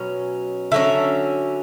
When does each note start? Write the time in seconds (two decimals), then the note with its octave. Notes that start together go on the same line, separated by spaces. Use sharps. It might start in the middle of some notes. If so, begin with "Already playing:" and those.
Already playing: B2 F#3 C#4
0.72 D3 F#3 C#4 E5